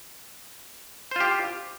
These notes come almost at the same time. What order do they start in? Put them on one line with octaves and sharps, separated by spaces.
C5 F4 G4